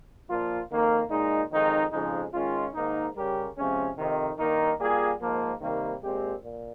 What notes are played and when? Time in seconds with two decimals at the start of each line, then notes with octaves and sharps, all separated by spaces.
0.29 A#2 F3 A#3 F4
0.70 F2 D#3 A#3
1.11 A#2 G#3 D#4
1.52 F2 D#3 G#3 D#4
1.92 F2 C#3 F3 G#3 D#4
2.34 D#3 G#3 C#4 F4
2.74 G#2 D#3 A#3 D#4
3.16 C#3 G3 C#4 G4 A#4
3.57 C3 F3 G#3 C#4
3.98 F2 C3 D#3
4.38 G2 D#3 A#3 D#4 A#4
4.80 G3 A#3 F4 G#4
5.21 G#2 F3 A#3
5.62 C3 D#3 G3 A#3
6.03 A#2 G#3 C4 G4
6.43 A#2